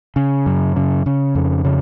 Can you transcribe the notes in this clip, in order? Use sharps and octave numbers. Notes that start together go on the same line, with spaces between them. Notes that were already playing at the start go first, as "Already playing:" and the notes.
C#3
F#2
C#3
C#3
F2
C#3